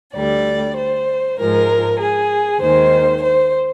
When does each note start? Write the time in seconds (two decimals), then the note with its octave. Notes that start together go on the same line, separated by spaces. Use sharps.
0.15 D2 D3 G3 D5
0.77 C5
1.38 G#2 F3 G#3 A#4
1.99 G#4
2.60 D#2 D#3 G#3 C5
3.21 C5